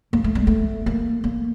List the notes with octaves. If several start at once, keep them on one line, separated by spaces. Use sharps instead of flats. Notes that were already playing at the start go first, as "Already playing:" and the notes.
A#3
A3
G3
A3
A#3
A#3